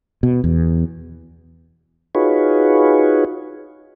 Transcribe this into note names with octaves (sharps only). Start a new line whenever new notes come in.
B2
E2
D#4 F4 F#4 G#4 B4 C#5